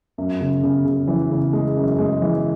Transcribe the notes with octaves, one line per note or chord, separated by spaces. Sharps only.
F#2
C#3
C#3
C#3
E3
C#3
G#3
F#2
G#3
E3